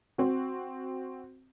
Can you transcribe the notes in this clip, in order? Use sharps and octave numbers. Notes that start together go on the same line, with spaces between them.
C4 F#4